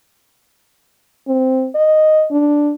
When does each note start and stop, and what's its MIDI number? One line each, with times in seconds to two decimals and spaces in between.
1.28 1.68 60
1.75 2.26 75
2.31 2.73 62